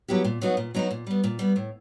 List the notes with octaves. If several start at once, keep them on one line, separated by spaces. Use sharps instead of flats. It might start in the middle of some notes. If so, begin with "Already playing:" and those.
F#3 B3 E4 G4
A#2
F#3 B3 D#4 F#4
A#2
F#3 B3 D#4 F#4
A#2
G3 B3
A#2
G3 B3
A2